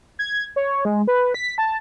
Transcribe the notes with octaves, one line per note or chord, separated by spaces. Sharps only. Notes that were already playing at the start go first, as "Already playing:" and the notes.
G#6
C#5
G#3
B4
B6
A5